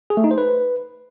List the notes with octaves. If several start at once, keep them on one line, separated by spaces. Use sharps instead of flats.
G#4
A3
D#4
C5
B4